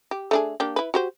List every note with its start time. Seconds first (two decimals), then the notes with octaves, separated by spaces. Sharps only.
0.11 G4
0.31 A3 D4 G#4
0.60 A#3 D4 G4
0.76 E4 B4
0.94 F#4 G4 C5